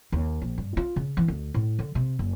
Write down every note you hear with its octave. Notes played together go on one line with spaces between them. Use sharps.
D#2
A#1
G2
F4
C#3
E3
D2
A2
D3
C3
F#1